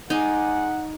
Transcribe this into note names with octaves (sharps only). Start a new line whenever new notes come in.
G#3 D#4 D5 F#5 G#5